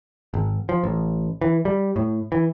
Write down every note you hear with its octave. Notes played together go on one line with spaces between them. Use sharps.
G#1
F3
A1
E3
G3
A2
E3